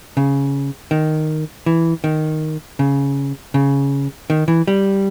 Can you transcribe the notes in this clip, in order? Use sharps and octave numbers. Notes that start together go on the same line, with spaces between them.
C#3
D#3
E3
D#3
C#3
C#3
D#3
E3
G3